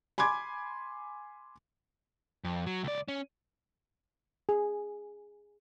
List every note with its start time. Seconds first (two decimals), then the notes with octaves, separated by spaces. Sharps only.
0.18 G#5 B5 C6 D6 G#6
2.44 F2
2.66 F#3
2.84 C#2 D5
3.08 C#4
4.49 G#4